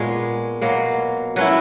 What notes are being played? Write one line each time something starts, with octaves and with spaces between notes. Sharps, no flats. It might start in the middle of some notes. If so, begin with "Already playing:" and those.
Already playing: A#2 G#3 B3 C#5
B2 F#3 A#3
F#3 C#4 E4 B4